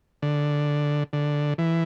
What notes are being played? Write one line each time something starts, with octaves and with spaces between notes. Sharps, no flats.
D3
D3
E3